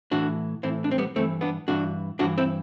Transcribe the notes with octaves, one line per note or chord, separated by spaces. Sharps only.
A2 E3 D4 F#4
A2 E3 C4 E4
D4
C4
G3 B3
G2 E3 A3 C4
B3 D4
G2 E3 D4 F#4
G2 E3 D4 F#4
C4 E4